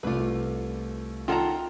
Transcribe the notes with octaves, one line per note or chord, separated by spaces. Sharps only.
C2 A3 F4 B4 D6
D#3 F4 A4 F#5 A5 A#5